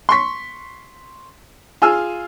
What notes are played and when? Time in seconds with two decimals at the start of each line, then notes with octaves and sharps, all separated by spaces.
0.09 C6 C#6 B6
1.82 F4 G#4 G#5 E6 F6